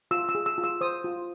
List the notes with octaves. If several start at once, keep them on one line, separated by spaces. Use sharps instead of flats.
F4 E6
E6
G#4
E6
F4
E6
C5 D#6
F4